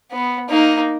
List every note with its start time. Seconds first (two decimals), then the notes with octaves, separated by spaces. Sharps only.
0.11 B3
0.49 A#3 D#4